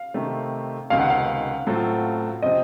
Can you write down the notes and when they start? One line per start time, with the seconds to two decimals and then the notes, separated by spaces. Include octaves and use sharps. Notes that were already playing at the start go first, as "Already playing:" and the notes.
Already playing: F5
0.14 C3 D#3 A3
0.90 C#2 C3 D#3 F5
1.00 F#5
1.10 F5
1.67 A2 F#3 C4 F4 A4
2.42 C3 F3 C4 D#5